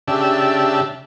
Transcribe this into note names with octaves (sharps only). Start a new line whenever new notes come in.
C#3 D4 G4 E5 A5